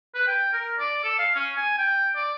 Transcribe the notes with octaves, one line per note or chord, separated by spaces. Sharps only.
B4
G5
A#4
D5
A4
F5
C#4
G#5
G5
D5